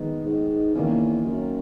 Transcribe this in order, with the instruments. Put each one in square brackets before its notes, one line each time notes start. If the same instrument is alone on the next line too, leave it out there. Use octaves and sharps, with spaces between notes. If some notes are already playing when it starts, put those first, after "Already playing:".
Already playing: [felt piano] D#3 G#3 B3 D#4
[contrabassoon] G#2
[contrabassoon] E2 [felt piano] D#3 A#3 C#4
[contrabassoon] F#2